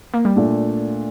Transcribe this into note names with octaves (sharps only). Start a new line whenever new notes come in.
A#3
G3
A#2 A3 D4